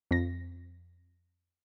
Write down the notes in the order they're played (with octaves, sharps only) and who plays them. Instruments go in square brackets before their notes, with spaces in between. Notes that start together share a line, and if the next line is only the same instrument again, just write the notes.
[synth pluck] F2 A#6